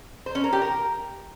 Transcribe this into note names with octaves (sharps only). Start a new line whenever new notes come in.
C5
C#4
A#4
G4
A#4